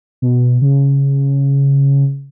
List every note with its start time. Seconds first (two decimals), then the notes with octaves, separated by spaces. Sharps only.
0.22 B2
0.62 C#3